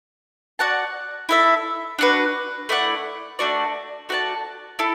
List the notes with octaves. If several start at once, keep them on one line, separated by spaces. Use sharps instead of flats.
F#4 D5 F#5 A5
E4 A4 E5
D4 F#4 B4
A3 E4 D5 F#5
A3 D4 F#4 D5
A3 F#4 D5 A5
E4 A4